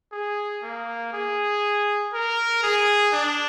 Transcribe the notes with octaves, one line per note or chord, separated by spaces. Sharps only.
G#4
A#3
G#4
A#4
G#4
D4